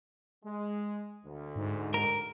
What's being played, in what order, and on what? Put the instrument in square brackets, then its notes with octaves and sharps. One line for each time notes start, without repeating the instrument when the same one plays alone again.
[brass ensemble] G#3
D2
[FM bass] G#2
[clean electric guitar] A#4